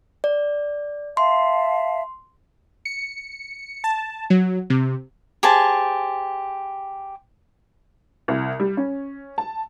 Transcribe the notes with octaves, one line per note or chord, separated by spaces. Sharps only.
D5
E5 F5 A5 C6
C#7
A5
F#3
C3
G4 G#4 C5 A5
C2
G3
C#4
A5